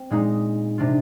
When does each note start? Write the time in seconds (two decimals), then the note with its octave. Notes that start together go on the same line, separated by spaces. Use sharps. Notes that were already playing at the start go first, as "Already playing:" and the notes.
Already playing: C4
0.10 A#2 G#3 D#4
0.78 C3 G3 D4 F4